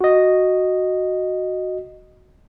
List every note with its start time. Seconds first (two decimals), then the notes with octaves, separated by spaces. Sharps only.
0.01 F#4 D#5